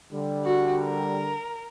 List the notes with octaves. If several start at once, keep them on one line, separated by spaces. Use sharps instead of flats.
D3 G3
F#4
A#4